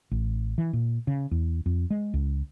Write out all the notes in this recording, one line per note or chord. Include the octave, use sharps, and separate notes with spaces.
A1
E3
A#2
C#3
E2
F2
G#3
C#2